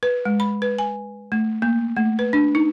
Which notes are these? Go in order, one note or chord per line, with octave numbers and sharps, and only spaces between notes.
B4
G#3
B5
B4
G#5
A3
A#3
A3
B4
D4
D#4